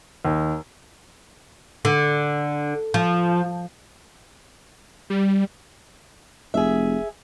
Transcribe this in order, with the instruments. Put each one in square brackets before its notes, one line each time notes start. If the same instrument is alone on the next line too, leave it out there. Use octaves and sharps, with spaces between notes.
[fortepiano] D#2
[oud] D3
F3
[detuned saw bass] G3
[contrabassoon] F1 [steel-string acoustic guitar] G#4 E5